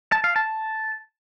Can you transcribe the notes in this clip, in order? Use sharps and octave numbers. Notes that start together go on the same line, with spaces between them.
A5
F5
A5